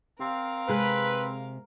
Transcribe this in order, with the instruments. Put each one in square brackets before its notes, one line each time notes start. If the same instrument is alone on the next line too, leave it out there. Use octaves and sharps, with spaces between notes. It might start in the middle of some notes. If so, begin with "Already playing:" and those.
[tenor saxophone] C4 [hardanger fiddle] A#4 F5
[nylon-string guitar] C3 G#3 G#4 [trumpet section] B4